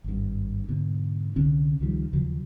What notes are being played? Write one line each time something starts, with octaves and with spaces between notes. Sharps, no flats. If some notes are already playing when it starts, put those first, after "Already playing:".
G#1 G2
G#2 B2 D3
C2 D3 C#4
C#2 D#3 F3 G3
D#2 C#3 F3 F#3